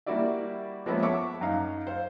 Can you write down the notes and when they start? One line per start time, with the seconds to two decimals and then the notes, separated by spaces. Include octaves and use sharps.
0.06 G3 A#3 E4 F#4 D5 E5
0.86 F3 G#3 A#3 B3 C#4 E5
1.02 C#5 E5 F#5 A5 C#6 D6
1.41 F#2 D#4 F5
1.87 C5 F5